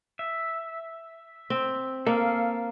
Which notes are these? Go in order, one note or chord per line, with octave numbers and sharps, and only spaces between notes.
E5
C4
A#3 A4 F5